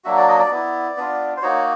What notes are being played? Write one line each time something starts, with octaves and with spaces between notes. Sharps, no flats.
F#3 A#3 D4 F#4 E5
D5
D#5
D5
B3 E4
B3 D4 F4
C5
A#3 D#4 F#4 C#5